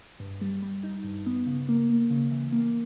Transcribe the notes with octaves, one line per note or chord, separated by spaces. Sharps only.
G2
G3
G3
D#4
G2
B3
C#3
A#3
A#3
C#3
E3
A#3